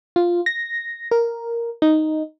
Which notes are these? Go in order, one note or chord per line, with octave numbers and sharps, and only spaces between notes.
F4
A#6
A#4
D#4